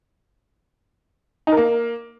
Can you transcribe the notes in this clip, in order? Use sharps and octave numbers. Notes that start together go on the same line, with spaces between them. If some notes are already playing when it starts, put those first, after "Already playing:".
D#4
A#4
A#3